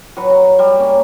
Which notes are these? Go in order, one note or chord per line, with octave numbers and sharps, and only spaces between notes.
F#3 B4 C#6
A#5
G3
A#3 C#4